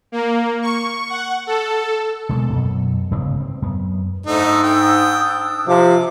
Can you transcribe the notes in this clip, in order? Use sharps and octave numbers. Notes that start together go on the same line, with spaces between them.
A#3
C#6
F#5
A4
B2 G#3 A#3
F#2 B2
G1 G#2 C#3 B3
C4
F#2 B3
G#2 A3 D4 D#4 D#6 E6
G5
C3 F3 G4 D6